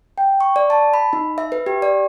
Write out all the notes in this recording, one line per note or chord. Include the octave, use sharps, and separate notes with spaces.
G5
C#6
D5
A5
B5
D#4
E5
B4
G4
D5